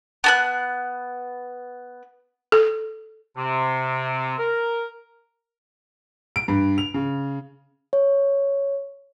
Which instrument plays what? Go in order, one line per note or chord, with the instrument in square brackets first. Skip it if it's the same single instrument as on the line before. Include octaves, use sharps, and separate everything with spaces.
[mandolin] B3 A5 F#6
[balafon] A4
[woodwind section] C3
A#4
[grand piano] D7
G2
F7
C#3
[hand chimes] C#5